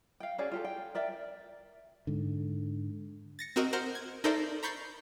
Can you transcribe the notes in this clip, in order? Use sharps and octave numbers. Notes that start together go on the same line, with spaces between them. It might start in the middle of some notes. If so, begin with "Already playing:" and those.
F5 G5
C#4 F#4 G#4 D5
F4 G4 A4
G5
A#4 D5 E5 G5
G#2 D3
A6 A#6 C#7
C4 F#4 A#4 D#5
A#4 C5 F#5 C6 F6
G#6
D#4 A4 A#4 C5 D5 E5
A#5 B5 C#6 G6 A6 C7